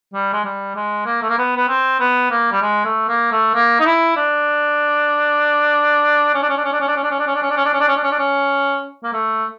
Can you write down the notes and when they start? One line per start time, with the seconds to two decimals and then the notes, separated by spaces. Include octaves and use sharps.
0.14 G3
0.33 G#3
0.44 G3
0.76 G#3
1.06 A#3
1.22 A3
1.29 A#3
1.38 B3
1.56 B3
1.68 C4
2.00 B3
2.31 A#3
2.51 G3
2.62 G#3
2.85 A3
3.08 A#3
3.32 A3
3.54 A#3
3.80 D#4
3.86 E4
4.17 D4
6.34 C#4
6.42 D4
6.49 C#4
6.57 D4
6.65 C#4
6.72 D4
6.80 C#4
6.88 D4
6.96 C#4
7.03 D4
7.11 C#4
7.19 D4
7.27 C#4
7.35 D4
7.42 C#4
7.50 D4
7.57 C#4
7.65 D4
7.73 C#4
7.80 D4
7.88 C#4
7.97 D4
8.03 C#4
8.11 D4
8.19 C#4
9.04 A#3
9.13 A3